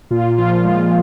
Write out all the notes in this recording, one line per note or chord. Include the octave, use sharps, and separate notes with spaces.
A#2 F4
F3 F4
G#3 F4